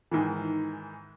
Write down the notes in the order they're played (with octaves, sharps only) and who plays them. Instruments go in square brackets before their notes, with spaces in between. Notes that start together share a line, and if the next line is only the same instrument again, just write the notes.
[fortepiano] G#2 D#3 E3